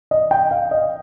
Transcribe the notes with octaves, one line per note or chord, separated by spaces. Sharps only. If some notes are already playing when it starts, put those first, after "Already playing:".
D#5
G5
F5
D#5